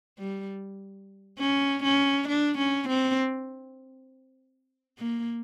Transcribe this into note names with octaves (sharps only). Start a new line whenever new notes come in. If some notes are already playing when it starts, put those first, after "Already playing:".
G3
C#4
C#4
D4
C#4
C4
A#3